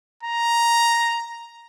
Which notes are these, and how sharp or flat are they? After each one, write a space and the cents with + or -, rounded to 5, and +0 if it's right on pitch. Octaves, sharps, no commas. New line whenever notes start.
A#5 +5